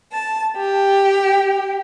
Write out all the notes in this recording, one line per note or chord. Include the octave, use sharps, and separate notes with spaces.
A5
G4